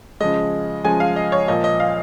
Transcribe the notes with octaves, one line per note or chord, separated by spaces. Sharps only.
C#3 F3 G#3 D#5
C#3 F3 G#3 G#5
F5
D#5
C#5
A#2 F3 A#3 D#5
D#5
F5